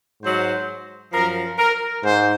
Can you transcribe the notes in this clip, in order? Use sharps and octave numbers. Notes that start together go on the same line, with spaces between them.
G#2 F#3 C5
F#2 F3 A#4
A#4
G#2 C5